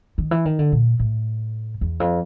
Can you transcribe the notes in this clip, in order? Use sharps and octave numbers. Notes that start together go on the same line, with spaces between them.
D#3
E3
D#3
D3
A#2
A2
E2
F2